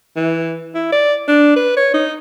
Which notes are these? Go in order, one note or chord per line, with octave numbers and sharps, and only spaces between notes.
E3
E4
D5
D4
B4
C#5
D#4